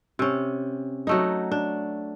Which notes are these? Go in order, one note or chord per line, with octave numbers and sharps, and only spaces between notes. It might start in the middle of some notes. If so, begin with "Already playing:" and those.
C3 C#4
F#3 A3 D#4
D4